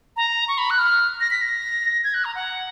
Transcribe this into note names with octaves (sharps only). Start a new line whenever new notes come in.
A#5
C#6
B5
F#6
F6
A#6
B6
A#6
G#6
F#6
A#5
F#5